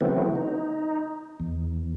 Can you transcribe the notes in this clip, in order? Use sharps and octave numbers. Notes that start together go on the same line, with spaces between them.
C#3 E3 F#3 A3 B3 C4
D#4
E2